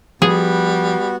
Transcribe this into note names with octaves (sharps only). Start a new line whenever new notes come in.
F3 G3 B3 F#4 G#4